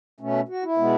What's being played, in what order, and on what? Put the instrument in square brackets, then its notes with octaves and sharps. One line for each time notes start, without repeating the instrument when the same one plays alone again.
[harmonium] B2 A3 C#4
F#4
E4
B2 G#3 B3